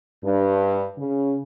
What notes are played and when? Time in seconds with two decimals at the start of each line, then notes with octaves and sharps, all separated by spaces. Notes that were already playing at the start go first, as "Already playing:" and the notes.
0.24 G2
0.98 C#3